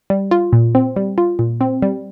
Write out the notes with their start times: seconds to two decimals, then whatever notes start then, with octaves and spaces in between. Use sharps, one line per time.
0.10 G3
0.31 F4
0.53 A#2
0.75 C4
0.96 G3
1.18 F4
1.39 A#2
1.61 C4
1.82 G3